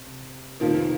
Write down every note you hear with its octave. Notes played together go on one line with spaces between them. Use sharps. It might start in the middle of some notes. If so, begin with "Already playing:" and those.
Already playing: C3
F1 F2 C3 D#3 F3 A#3